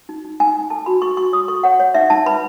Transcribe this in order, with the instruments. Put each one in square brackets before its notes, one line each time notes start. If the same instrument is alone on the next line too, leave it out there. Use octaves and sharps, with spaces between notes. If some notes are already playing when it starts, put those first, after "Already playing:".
[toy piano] D#4
D#4
D#4 G#5
D#4
A4 A5
F#4 B5
A4 C#6
F#4 C#6
C#5 D#6
A4 C#6
C#5 F#5
C#5
D#4 E5
D#4 A5
B4 B5